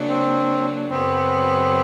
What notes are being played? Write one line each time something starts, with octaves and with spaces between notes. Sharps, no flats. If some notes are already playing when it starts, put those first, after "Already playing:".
Already playing: C#3 F#3 A#3 D4
C4
F#2 C#3 F#3 B3 C4